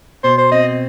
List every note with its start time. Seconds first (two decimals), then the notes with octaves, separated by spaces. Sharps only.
0.24 B2 C5
0.38 C5
0.52 C4 D#5